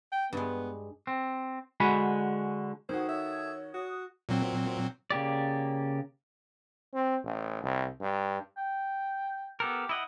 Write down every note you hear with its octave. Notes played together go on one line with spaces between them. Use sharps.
G5
G2 G#3 B3
C4
D3 G#3 F#4 G#5 B5
D#3 F#4 A4 C5 D#6 G#6
C#5 E5
F#4 D#6 F#6
A#2 F#3 C4
C#3 A#3 G4 D5
C4
A1
C2
G2
G5
B3 G4 A4 A#4
E4 D#5 F#5